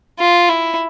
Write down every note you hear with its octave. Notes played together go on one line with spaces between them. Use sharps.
F4
E4